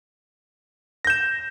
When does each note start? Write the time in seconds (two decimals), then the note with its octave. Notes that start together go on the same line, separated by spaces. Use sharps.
1.05 A#6
1.07 G6
1.10 E7